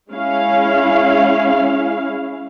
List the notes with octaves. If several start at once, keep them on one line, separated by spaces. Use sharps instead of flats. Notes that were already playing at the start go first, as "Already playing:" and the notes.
G#3 C#4 E4 F5